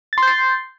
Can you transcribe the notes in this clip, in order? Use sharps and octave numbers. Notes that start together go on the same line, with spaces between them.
C6 G6 A6 C7